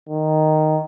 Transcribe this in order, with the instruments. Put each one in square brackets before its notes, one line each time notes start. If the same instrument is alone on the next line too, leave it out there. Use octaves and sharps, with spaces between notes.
[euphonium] D#3